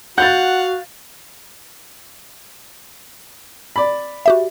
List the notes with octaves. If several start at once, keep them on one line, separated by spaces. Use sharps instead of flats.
F#4 F5 F#5 G6 A6
D5 B5
F#4 G4 E5